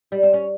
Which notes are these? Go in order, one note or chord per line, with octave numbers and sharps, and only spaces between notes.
G3
C4
C#4